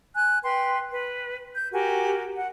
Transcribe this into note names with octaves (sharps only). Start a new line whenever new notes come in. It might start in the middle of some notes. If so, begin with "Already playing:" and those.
G#5 F#6
B4 G5 C6
B4
G6
F#4 G4 A#4 G#5
F#5